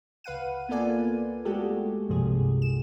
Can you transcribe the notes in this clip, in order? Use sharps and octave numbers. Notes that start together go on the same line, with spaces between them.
C#2 B4 F5 F#5 D#7
A#3 B3 F4 A4 D5 G#5
G#3 A3 F#4 G4 A4
C2 G2 C3 F3 G#4
E7